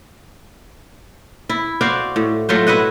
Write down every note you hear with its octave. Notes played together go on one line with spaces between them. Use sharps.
E4
F#4 C5 D5 F5
A2
F#3 A3 F4 C5
E4 B4 D#5 F#5